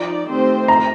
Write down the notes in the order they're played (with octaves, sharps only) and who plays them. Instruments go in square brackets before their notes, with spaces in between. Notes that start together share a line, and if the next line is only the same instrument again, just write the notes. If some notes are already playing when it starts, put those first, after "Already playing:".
Already playing: [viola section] F3 D#4 D5
D#3 A3 C4 G4 C5
[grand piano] A#5